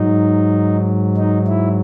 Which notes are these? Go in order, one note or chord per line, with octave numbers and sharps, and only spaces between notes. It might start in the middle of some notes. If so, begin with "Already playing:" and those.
Already playing: G#2 F#3 D#4
D#4
E4